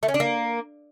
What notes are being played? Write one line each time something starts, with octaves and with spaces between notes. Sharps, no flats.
A3
C#4
D4
A#3